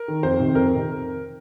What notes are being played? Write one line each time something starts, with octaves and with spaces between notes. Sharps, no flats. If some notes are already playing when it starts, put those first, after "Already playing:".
Already playing: A#4
D#3
F2 C5
C3 D#3
F2 A#4
C3 D#3